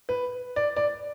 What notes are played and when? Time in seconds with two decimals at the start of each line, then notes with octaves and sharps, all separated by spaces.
0.09 B4
0.56 D5
0.76 D5